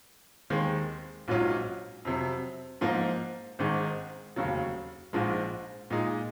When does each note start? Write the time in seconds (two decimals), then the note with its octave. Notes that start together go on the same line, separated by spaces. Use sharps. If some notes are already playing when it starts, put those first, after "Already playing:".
0.50 D#2 D#3 G#3 C4
1.28 A#1 G#2 F#3 C#4 F4
2.05 F2 C3 F#3
2.81 G#2 F3 A#3
3.59 G#1 G#2 D#3 G#3
4.36 F1 D#2 C#3 F#3
5.13 A#1 G#2 F3 G#3
5.90 A#2 G#3 D#4